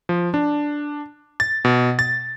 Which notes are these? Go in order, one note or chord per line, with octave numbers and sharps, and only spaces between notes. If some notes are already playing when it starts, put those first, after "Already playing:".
F3
D4
A6
B2
A6